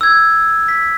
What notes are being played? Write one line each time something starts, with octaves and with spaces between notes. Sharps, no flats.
E6 G#6
B6